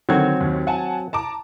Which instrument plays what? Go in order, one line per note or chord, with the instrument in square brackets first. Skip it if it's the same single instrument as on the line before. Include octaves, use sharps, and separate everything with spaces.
[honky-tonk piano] D3 D#3 G#6 [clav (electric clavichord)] F#3 C4 F#4
[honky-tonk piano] D#2
F#5 G#5 A5
A5 A#5 D6